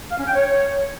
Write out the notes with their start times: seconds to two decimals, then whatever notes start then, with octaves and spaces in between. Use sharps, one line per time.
0.10 F5
0.18 C#4
0.26 G5
0.34 C#5